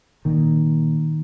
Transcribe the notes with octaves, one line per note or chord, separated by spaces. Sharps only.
A#2 D#3